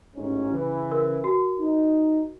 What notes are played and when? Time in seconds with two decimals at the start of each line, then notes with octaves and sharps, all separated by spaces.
0.15 A1 G#2 C#4
0.52 C#3 E3
0.91 A#4
1.24 F#4
1.58 D#4